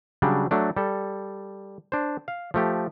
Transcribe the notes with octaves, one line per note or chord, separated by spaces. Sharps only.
C#3 F#3 G3 D4
F#3 A3 D4
G3 A4
D4 C5
F5
F3 A3 G4